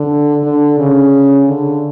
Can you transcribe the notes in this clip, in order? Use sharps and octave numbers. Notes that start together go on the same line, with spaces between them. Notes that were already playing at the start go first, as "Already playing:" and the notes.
Already playing: D3
D3
C#3
D3